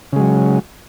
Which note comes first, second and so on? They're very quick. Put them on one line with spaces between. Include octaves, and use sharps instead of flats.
C#3 G#3 F#3